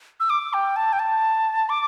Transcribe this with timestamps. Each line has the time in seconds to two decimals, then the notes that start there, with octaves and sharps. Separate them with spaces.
0.20 E6
0.30 D6
0.53 G5
0.76 A5
0.93 G5
0.99 A5
1.69 D6